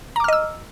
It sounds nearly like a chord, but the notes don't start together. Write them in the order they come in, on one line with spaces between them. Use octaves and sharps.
A#5 D6 F6 D#5 E6